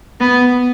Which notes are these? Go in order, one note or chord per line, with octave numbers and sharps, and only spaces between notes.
B3